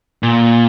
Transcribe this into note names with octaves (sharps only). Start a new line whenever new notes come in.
A#2